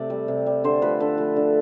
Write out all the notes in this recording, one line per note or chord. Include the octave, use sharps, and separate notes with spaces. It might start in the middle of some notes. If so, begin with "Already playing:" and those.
Already playing: C3 A3 D5 E5
G3
C3
G3
D3 C5
F3 A3 B4
D3 A4
F3 A3
D3